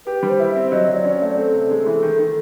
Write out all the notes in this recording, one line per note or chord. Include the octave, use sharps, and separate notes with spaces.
G4 B4
G3
C5
E4
E5
C4
F#3 D#5
F#3 D5
C#4
D5
A3
C4 A4
C3
G#3
E3
D#3
D#3